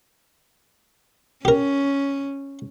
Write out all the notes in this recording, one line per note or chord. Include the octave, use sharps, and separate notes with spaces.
C#4 G4 A#4